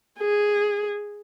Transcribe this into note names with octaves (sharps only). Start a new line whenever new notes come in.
G#4